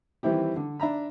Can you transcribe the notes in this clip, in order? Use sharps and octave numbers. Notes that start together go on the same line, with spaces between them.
D#3 E3 G3 C4 E4 G4
D3
D4 E5 A#5 B5